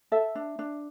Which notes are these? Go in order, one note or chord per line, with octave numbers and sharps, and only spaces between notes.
A4 E5
D4
D4